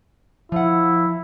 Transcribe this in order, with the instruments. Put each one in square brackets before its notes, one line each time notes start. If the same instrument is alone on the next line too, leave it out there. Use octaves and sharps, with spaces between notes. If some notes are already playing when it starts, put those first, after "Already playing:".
[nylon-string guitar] F3 F#5 [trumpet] E4